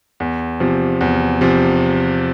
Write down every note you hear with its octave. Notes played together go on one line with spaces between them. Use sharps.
E2
C3 F3
E2
C3 F3